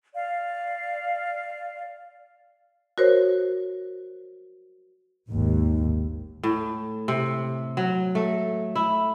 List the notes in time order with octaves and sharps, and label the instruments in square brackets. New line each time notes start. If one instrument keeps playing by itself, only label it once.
[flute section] D5 F5
[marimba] F#4 A#4 C5 C#5
[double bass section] G#1 D#2
[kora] A2
C3
F#3
A3
E4